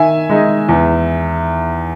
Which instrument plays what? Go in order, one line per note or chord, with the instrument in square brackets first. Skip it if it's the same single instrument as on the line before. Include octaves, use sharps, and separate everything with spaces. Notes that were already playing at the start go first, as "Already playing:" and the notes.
Already playing: [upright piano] D#3 E5 G#5
G#3 D#4
E2